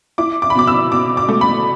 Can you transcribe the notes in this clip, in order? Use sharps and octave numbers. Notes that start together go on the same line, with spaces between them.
E4 D6
D6
B5
B2 D6
E6
B2 D6
D6
A3
B5